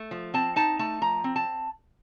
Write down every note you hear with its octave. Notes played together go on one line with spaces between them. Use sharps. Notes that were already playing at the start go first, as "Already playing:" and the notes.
Already playing: A3
F3
C4 A5
D#4 A5
A3 A5
F3 A#5
C4
A5